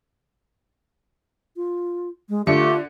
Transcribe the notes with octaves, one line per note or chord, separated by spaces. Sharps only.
F4
G#3
D3 A3 F4 G4 C#7